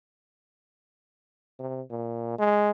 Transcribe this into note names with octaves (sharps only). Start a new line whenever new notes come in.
C3
A#2
G#3